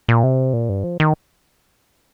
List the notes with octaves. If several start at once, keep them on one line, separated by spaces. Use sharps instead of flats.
A#2
C3
A#2
G2
F3
D#3